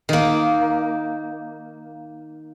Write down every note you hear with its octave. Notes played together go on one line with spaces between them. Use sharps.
D#3 A#3